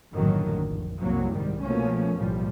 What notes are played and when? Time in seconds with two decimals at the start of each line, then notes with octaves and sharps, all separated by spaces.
0.14 A#1 F#2 A2 D3 D#3 F#3
0.65 F1
1.01 C2 F#2 F#3 A#3
1.34 G#2 D#3 G3
1.63 B2 F3 A3 A#3 C#4
2.18 B1 A2 F3 G3